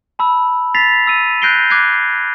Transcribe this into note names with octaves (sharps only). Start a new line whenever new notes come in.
A5 B5 E6
A6 B6 C7 F7
E6 D#7
F#6 G6 A#6 C7 D7 G7
D6 F#6 G#6 C7